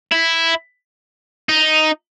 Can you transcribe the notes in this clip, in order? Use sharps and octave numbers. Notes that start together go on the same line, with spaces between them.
E4
D#4